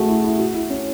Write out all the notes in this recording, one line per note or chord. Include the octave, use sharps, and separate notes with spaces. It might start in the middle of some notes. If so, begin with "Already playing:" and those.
Already playing: A3 F#4 G#4
E4
E4
F#4
E4
C#4